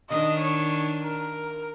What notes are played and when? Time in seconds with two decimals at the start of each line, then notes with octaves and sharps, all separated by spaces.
0.10 D#3 D4 D#5
0.39 C#5
1.01 A#4